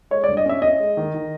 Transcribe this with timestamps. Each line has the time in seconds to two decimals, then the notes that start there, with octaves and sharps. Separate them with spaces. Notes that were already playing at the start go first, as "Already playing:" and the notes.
0.11 G#3 C#5
0.24 D5
0.28 G2
0.37 D#5
0.46 C#4 E5
0.62 C#4 D#5
0.80 G#3
0.97 D#3
1.14 D#3